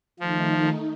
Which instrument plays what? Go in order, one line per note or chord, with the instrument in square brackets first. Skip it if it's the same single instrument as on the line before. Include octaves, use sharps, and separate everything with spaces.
[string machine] D#3 A3 D#4 [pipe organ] F3